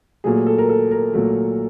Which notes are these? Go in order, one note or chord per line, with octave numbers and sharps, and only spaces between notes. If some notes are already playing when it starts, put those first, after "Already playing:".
A#2 F#3 A3 G#4
A4
A#4
A4
A#4
A#2 F#3 A3